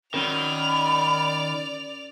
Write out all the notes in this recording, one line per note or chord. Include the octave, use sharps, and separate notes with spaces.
D#3 C#4 A#4 D5 B5 F7